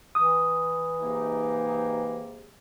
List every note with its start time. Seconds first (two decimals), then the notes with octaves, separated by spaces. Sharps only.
0.15 E3 D#6
1.01 G#2 C3 A#3 D#4